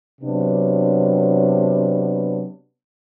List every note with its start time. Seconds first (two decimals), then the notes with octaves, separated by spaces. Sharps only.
0.21 C3 F#3 B3 D4